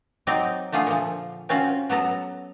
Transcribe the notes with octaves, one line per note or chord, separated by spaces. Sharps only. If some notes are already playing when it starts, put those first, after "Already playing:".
F#3 C4 D#4 D5 D#5
D3 A3 F4 G#4
A#2 F3
C4 C#4 F4 F#4
F#3 B3 A4 A#5